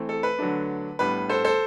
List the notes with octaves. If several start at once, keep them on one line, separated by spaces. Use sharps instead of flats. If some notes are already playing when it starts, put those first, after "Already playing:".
Already playing: E3 A3 C4
A4
B4
D3 F#3 A3 D4
A2 G3 B3 D4 B4
A4 C5
A4 C5